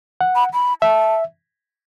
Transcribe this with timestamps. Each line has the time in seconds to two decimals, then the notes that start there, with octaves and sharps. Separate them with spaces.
0.21 F#5
0.35 B5
0.54 B5
0.82 E5 A5